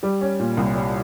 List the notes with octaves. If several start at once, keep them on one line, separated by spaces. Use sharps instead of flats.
G3 G4
C#4
A#2
C2
G3